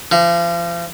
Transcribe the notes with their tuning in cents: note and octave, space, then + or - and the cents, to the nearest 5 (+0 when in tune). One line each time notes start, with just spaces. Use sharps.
F3 -40